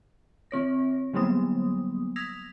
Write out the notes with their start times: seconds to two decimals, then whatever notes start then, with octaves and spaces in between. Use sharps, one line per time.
0.51 D#3 C4 C#5 A#6
1.13 D3 F#3 G3 A#3 B3 D#6
2.16 D#6 E6 G#6 A#6 B6 F7